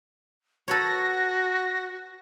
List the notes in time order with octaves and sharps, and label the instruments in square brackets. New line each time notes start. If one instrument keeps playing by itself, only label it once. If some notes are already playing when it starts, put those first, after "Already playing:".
[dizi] F#4 [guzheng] A4 B4 C#5 [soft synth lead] A#6